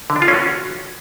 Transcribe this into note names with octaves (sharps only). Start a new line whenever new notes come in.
D3
D4
F4
C#4
F#4